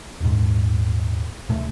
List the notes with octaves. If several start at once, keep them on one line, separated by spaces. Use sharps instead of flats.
D#1 G#2
D2 A2 C3 A3